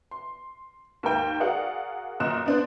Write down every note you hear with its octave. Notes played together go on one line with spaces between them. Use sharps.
C6
D#2 G#2 A#4 G5
F#4 G#4 A#4 D5 F5 F#5
F#2 A#2 D#5 C6 F#6 E7
B3 D4 C5